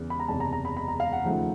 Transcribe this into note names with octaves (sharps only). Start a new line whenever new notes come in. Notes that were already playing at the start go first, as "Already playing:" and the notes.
Already playing: E2 C#3 E3
B5
A#5
F#1 E2 C3 A5
A#5
A#5
B5
B5
A#5
F5
F#5
D#2 C#3 F3 A3